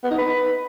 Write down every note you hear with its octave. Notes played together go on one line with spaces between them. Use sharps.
B3
D#4
B4